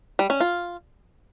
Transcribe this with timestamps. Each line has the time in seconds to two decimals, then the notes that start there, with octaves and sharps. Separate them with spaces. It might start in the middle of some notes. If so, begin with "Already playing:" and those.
0.19 G3
0.30 C#4
0.41 F4